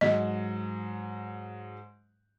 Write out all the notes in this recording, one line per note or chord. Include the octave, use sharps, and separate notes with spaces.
G#2 F#3 D#5